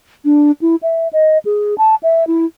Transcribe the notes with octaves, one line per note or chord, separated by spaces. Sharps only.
D4
E4
E5
D#5
G#4
A5
E5
E4